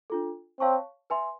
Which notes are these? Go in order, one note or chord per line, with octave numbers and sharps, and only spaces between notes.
D4 F4 A4
C4 C#5 F5 A5 C#6
B4 E5 G#5 C6